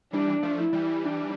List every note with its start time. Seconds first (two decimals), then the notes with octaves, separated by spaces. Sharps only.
0.13 E3 G3 D4
0.42 F3 A3
0.58 E4
0.73 E3 G3
1.02 D4